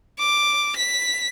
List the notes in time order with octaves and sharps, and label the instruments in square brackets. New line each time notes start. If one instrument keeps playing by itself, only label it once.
[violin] D6
B6